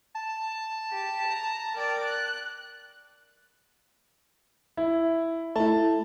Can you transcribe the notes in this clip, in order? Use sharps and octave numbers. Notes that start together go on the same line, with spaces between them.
A5
G4
A#5
A#4 D5 G5
F#6
E4
A3 E4 A5